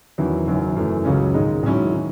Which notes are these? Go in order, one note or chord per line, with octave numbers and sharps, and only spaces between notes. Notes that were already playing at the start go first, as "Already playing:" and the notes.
E2 D#3 F#3 C#4 E4
F#1 F#2 D#3 F#3
F#2 E3 A3
C#2 C#3 F#3 C#4
G#2 D#3 G#3 D#4
G#2 D#3 F#3 C#4 E4
D#3